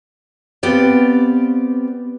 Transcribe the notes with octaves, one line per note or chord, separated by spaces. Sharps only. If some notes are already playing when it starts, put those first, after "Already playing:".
B3 C4 G4 D5 F5